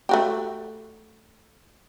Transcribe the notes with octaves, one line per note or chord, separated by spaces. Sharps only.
A3 F#4 G4